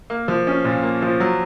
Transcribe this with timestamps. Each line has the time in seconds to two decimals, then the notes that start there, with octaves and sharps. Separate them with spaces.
0.10 A#3
0.28 F3
0.47 C#4
0.64 A#2
0.83 A#3
1.02 F3
1.20 F#3